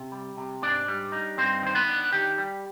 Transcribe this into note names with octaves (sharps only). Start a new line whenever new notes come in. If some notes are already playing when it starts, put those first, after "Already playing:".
Already playing: C3
G3
C3
G#2 D4 D5
G3
D#4
G2 C4 C5
D#3 C5
B3 B4
D4
D#3 G4
G3